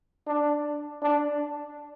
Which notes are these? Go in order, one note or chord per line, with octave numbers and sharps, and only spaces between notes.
D4
D4